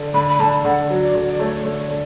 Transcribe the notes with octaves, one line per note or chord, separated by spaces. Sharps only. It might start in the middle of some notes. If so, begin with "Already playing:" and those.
Already playing: D3
D3 B5
B5
D3 A5
D3 F#5
F#3
D5
D3
D5
A3 C#5
D3
D3